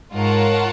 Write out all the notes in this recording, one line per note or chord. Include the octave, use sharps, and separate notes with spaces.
G#2 F4 A#4 C#5 F#5 A5